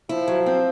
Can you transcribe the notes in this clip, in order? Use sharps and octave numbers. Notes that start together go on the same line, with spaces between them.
F3 E4
F#3
C4